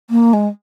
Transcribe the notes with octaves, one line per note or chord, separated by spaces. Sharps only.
A#3
G#3